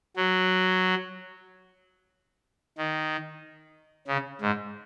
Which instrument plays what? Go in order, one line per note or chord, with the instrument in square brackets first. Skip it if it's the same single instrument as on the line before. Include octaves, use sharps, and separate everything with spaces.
[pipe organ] F#3
D#3
C#3
G#2